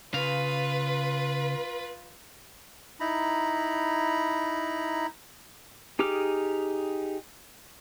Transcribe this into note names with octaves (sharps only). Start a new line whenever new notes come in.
C#3 F4 B4 F5
D#4 E4 A#5 B5
D#4 G4 G#4 D6 F6